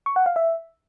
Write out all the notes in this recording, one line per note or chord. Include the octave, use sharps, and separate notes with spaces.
C#6
F#5
F5
E5